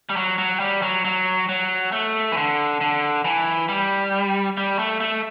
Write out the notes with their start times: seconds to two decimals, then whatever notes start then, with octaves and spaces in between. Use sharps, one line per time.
0.09 G3
0.16 F#3
0.38 F#3
0.60 G3
0.82 F#3
1.05 F#3
1.49 F#3
1.92 A3
2.32 E3
2.37 D3
2.81 D3
3.25 E3
3.69 G3
4.57 G3
4.79 A3
5.00 A3